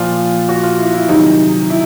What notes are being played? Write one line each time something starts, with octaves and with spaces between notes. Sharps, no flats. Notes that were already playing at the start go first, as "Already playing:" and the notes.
Already playing: A#2 F3 F4
F#4
F4
E4
E4
C3 D#3 F#3 D#4
E4